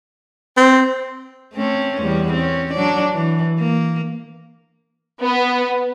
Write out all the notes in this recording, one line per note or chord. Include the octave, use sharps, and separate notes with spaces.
C4
A3 C4 C#4
E2 G3
C4 C#4
F#3 D4 D5
E3
A#3
B3